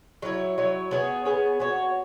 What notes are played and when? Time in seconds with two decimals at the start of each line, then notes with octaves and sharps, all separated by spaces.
0.22 F#3 E4 C#5
0.58 F#3 E4 C#5
0.91 B3 G#4 C#5
1.25 B3 G#4 C#5
1.60 B3 F#4 C#5